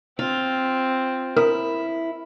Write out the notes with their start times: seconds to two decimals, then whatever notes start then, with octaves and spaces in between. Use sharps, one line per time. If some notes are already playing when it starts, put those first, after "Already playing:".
0.19 C4 F4
1.37 E4 A#4 D#6